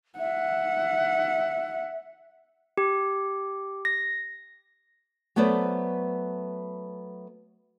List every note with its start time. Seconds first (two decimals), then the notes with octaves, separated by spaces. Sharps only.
0.19 E5 F#5
2.78 G4
3.85 A#6
5.36 F#3 A3 B3 B4 C5 D5